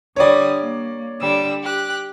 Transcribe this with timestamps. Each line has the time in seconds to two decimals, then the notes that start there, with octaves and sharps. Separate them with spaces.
0.16 D3 G3 C#5 D5 D#6
0.61 A#3
1.21 D3 G3 E6
1.63 G4 F#6